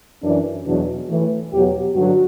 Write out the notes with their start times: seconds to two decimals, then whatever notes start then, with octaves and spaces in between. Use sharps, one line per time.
0.24 F#2 E3 D4
0.66 E2 B2 F#3 D4
1.10 A2 E3
1.53 E2 B2 F#3 G4
1.96 G2 D3 F#3 F#4